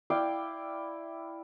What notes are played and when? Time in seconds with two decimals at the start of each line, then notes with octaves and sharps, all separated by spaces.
0.10 E4 D5 F5 G5